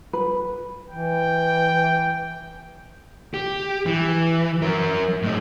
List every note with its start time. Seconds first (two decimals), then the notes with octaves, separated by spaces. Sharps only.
0.13 B4
0.90 E3 G5
3.34 G4
3.86 E3
4.62 F#3 A#4
5.22 A2 D#4